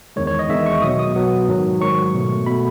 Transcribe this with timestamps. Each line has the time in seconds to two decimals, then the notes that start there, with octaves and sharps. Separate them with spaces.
0.16 E2 D#3 G#3 C#5
0.27 C#5
0.39 D#5
0.49 E2 D#3 G#3 E5
0.66 C#6
0.82 B2 F#3 B3 D#6
0.99 D#6
1.15 B2 F#3 B3
1.48 G#2 D#3 F#3
1.81 G#2 D#3 F#3 C#6
2.14 B2 A3
2.46 B2 B5
2.51 A3